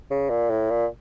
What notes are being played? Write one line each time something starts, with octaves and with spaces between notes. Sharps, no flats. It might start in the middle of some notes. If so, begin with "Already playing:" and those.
C#3
A#2
A2
A#2